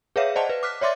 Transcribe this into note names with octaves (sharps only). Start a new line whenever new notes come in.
G#4 B4 C#5 E5 F5
C5 D5 D#5 F#5 A5
B4
D6 F6 F#6 B6
C#5 D5 E5 C6 D6 A6